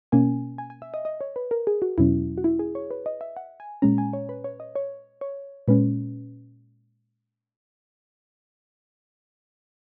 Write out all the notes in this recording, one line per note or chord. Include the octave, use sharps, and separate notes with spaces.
B2 A#3 C#4 G#5
G#5
G#5
E5
D#5
D#5
C#5
B4
A#4
G#4
F#4
E2 B2 F#3 C#4 E4
F#4
E4
G#4
C#5
B4
D#5
E5
F#5
G#5
A#2 G#3 C#4 A#5
G#5
C#5
B4
C#5
D#5
C#5
C#5
A#2 G#3 C#4 B4